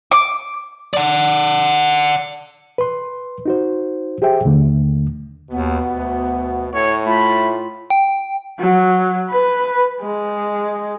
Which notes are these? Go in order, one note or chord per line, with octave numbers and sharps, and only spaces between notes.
D6
D5 F#5
B4 C6
D#4 F#4 C5
G4 G#4 C5 E5 G5
D#2 D3 A3
D#2 B2 B3
D2
A2 C#5
A3 F4 B5
G5
F#3
B4
G#3